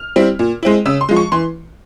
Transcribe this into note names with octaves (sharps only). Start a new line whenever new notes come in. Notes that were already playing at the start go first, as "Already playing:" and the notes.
Already playing: F6
G3 C4 E4
A#2
G#3 C4 E4
C#3 E6
C6
F3 G#3
C#6
E3 C6